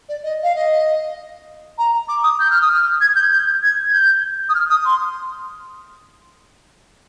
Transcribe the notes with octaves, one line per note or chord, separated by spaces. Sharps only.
D5
D#5
F5
D#5
A#5
D6
D#6
G6
F6
D#6
F6
G#6
G6
G6
G#6
G#6
G6
D#6
F6
D#6
C6